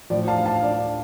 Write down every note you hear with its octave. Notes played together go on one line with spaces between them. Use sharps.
A2 F3 D5
F5 A5
F5 A5
D5